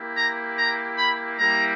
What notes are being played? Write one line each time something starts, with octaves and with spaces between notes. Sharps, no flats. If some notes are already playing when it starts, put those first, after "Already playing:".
Already playing: A#3 E4 G4
A#5
A#5
B5
G3 A#3 E4 G4 A#5